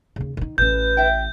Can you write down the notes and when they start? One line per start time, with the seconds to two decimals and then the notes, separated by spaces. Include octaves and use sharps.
0.16 D#2 C#3
0.37 D#3 D#4
0.58 A1 C#4 B4 G6
0.97 E5 G5